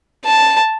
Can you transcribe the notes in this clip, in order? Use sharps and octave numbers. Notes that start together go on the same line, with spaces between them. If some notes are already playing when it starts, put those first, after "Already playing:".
A5